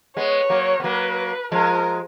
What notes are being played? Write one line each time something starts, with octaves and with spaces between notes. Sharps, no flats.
G#3 B3 C#5
F#3 A#3
B3
F#3 A#3 B4
F3 G#3 A#4